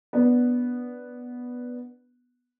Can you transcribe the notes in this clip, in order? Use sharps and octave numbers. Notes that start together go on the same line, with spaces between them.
B3 D4